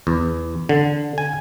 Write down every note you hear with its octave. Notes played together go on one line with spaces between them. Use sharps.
E2
D3
G#5